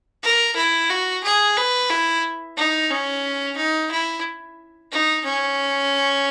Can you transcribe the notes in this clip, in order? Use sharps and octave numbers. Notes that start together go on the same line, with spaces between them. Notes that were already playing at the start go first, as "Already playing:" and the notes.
A#4
E4
F#4
G#4
B4
E4
D#4
C#4
D#4
E4
D#4
C#4